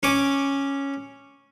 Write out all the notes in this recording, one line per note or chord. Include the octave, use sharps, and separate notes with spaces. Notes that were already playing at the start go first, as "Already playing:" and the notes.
C#4 D6